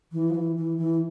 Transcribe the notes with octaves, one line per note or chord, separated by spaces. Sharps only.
E3
F3
E3
E3
E3